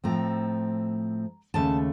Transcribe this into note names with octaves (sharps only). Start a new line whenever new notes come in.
A2 F3 A3 C4 A#5
D#2 C#3 A3 A5